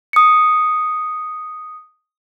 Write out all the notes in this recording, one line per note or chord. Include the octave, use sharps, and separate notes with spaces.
D#6 C#7